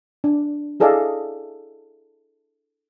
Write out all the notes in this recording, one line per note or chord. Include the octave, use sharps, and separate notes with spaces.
D4
E4 G#4 A4 D5 D#5 F5